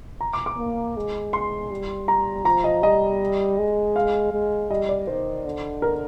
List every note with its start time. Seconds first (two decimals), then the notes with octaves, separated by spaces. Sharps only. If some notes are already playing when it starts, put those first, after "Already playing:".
0.21 A#5
0.33 D6
0.46 D6
0.58 A#3
0.97 G#3
1.33 C6
1.71 G3
2.08 A#5
2.45 F3 A#5
2.64 D#5
2.82 G3 D#5
3.58 G#3
3.96 F5
4.33 G#3
4.70 G3 D#5
4.89 D5
5.07 D#3 C5
5.46 D3
5.82 A#4